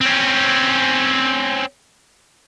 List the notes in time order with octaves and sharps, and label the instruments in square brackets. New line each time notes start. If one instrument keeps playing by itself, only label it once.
[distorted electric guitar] C4 C#4